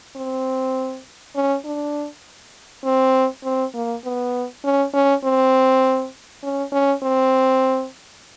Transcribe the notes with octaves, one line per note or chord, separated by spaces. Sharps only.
C4
C#4
D4
C4
C4
A#3
B3
C#4
C#4
C4
C#4
C#4
C4